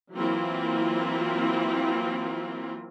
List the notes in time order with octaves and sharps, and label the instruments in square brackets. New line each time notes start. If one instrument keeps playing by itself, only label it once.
[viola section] E3 F#3 A#3 C4 E4 F4